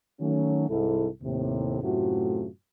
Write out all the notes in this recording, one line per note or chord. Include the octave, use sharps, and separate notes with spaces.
D#3 F#3 A3 C#4
C2 G#2 E4 A4
D#2 A2 C3
F#2 A2 C3 A3 F4 F#4